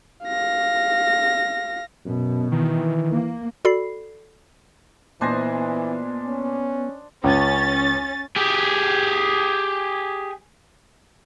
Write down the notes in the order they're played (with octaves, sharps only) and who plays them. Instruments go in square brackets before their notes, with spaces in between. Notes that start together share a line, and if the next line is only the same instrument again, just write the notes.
[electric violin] F5 A#6
[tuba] F#2 [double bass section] B2
[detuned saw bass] D#3 [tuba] E3
[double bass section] A#3
[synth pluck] F#4 A4 D5 B5 C7
[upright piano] A#2 G#5 A#6 [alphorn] E3 [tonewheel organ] B3 [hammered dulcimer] D4 C5 D#5
[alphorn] C#4
[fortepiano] C#2 [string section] C#4 A6
[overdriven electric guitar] G4 G#4